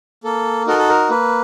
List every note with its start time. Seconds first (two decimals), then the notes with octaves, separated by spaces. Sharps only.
0.24 A#3 A4
0.67 D#4 F#4 A4 A#4
0.78 A4
0.89 A#4
1.10 A#3 B4